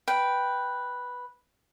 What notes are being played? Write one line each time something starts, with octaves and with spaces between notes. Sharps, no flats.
B4 G5